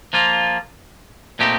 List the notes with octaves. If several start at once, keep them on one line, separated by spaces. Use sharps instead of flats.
F3 A#3 F4
A#2 A3 C4 D#4 G4